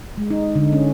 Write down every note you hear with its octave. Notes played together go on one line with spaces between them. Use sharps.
G#3
D#4
D3
C#4